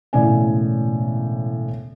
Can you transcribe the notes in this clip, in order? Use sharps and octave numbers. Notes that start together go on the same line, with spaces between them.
E1 A2 C#3 D5 G#5